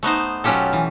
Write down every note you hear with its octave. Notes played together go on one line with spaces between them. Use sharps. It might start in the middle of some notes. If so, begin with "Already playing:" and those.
A3 B3 D#4 C5
B2 F#3 C#4 F4 G4 A4
E3